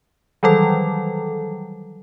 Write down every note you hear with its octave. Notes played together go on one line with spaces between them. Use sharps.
D#3 E3 F#3 G3 A4